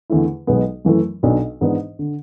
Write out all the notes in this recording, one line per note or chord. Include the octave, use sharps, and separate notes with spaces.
E2 D3 A3 E4
B1 B2 G#3 B3
F#2 E3 A3 E4
B1 B2 F#3 B3 D4
G#2 E3 B3 D4
D3